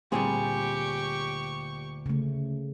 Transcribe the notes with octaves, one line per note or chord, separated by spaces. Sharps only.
D2 A#2 G3 C4 G4 G#4 C#6
C#3 A3